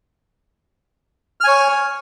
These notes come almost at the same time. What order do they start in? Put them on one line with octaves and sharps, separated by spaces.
F6 G#5 C#5